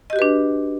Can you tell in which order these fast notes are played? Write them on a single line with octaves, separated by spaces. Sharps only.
D#5 G4 F#4 B4 D4